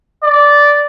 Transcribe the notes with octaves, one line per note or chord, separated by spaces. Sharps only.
D5